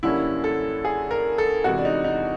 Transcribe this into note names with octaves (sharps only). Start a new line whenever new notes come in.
F#2 D3 G3 A#3 C#4 E4
A4
G#4
A#4
A4
E2 C3 E3 G#3 F#4
D4
D#4
D#4